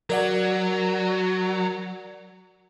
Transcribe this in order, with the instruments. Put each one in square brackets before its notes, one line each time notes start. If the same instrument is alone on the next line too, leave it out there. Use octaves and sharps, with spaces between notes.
[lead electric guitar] F#3 [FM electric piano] A#4 D5 F#5